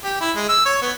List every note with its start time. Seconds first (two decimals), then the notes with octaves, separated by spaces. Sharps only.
0.04 G4
0.20 E4
0.36 G#3
0.49 E6
0.65 C#5
0.82 B3